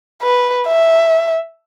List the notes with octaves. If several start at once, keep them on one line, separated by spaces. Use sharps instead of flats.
B4
E5